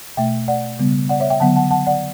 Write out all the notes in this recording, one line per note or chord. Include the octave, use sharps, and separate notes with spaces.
B2 A3 E5 G5
D5 F#5
C#3 G3 B3
D5 F#5
C#5 E5
E5 G5
D3 F#3 B3 F#5 A5
F#5 A5
F#5 A5
D5 F#5